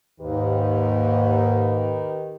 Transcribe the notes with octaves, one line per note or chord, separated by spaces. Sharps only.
D#2 G#2 D#3 G4 B4